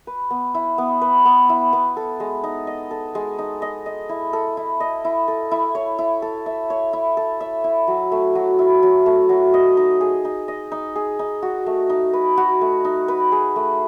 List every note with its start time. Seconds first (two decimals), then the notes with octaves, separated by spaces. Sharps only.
0.07 B4
0.30 B3
0.55 E4
0.78 B3
1.01 B4
1.25 B3
1.49 E4
1.73 B3
1.97 A4
2.20 G#3
2.44 D#4
2.67 D#5
2.91 A4
3.15 G#3
3.38 D#4
3.62 D#5
3.86 D#5
4.09 E4
4.33 A4
4.57 E4
4.80 D#5
5.05 E4
5.28 A4
5.51 E4
5.75 C#5
5.99 E4
6.22 A4
6.46 E5
6.70 C#5
6.93 E4
7.17 A4
7.41 E5
7.64 E4
7.88 F#3
8.12 A3
8.35 F#3
8.59 E4
8.83 F#3
9.06 A3
9.29 F#3
9.54 D#5
9.77 D#4
10.01 G#4
10.25 D#4
10.48 D#5
10.72 D#4
10.96 G#4
11.19 D#4
11.42 F#4
11.66 A3
11.90 D#4
12.13 B4
12.37 F#4
12.61 A3
12.85 D#4
13.08 B4
13.32 G#4
13.56 A3